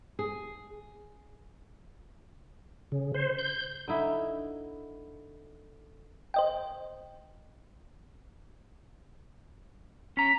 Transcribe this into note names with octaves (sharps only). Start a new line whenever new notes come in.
G#4
C#3
C5
G6
D3 D#4 E4
C5 D#5 G5
C#4 A#5 B6